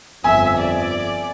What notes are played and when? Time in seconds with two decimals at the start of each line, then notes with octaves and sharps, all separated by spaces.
0.24 G1 F2 E5 G#5
0.58 D5